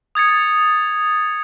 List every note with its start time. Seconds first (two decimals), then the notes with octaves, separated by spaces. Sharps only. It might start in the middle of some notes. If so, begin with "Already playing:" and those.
0.15 D#6 G#6 A6 C#7